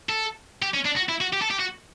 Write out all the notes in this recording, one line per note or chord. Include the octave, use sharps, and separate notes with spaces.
A4
G4
C#4
D4
F#4
E4
F#4
G4
A4
G4
F#4